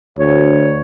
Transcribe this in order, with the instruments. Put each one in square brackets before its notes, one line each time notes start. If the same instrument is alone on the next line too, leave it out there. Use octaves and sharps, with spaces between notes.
[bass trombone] D2 [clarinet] C#5